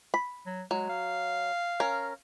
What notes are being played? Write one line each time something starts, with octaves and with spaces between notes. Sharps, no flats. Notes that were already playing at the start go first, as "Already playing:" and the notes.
B5
F#3
F#3 G#3
F5
C#4 A#4